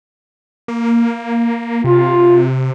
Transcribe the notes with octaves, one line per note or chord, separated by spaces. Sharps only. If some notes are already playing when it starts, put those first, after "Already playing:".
A#3
C3 F4